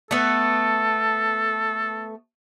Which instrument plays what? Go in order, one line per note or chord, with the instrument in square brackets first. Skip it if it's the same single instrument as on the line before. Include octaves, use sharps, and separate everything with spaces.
[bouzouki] A3 B3 [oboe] A4